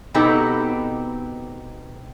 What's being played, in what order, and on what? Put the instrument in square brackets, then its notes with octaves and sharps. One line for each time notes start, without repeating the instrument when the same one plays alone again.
[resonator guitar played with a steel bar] B2 B3 C4 D#4 G4 A4